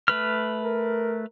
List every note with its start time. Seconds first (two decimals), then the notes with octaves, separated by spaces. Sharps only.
0.08 A3 B4 F6
0.63 A#4